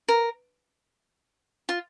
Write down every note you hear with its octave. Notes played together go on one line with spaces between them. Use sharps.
A#4
F4